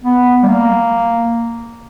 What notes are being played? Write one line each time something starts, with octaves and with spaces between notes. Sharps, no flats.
B3
G3
A#3